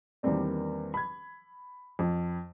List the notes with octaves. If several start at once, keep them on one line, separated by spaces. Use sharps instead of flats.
E2 D#3 G3 A#3 C4 D4
B5 G#6
F2